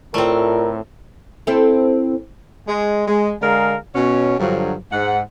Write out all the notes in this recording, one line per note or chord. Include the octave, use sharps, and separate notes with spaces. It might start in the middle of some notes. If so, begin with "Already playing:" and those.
A2 A3 C4 F4 A#4 D5
C4 E4 A4
G#3
G#3
D3 G#3 G#4 A#4 F5 A#5
B2 C#4 C#5
G2 D3 F3 F#3
G#2 F#5